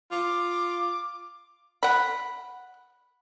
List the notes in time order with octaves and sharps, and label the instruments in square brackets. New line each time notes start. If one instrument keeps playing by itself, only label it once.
[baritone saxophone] F4 [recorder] D6
[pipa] F#5 B5